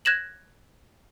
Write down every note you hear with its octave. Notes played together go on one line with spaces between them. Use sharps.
F#6 G#6 A#6 E7 F#7